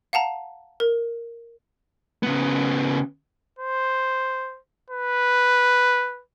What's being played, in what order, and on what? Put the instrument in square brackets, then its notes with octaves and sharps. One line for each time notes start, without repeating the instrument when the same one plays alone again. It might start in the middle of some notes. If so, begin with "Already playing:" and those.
[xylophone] F5 F#5 A5 A#5
A#4
[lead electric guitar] C#3 B3
[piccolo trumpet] C5
B4